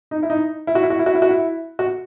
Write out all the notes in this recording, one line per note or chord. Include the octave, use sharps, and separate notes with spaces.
D#4
E4
D#4
E4
F#4
E4
F#4
E4
F#4
E4
F#4
E4
F#4